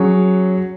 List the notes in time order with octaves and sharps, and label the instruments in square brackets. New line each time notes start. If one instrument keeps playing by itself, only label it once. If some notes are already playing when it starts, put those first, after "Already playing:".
Already playing: [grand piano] F#3 C#4 G#4 C#5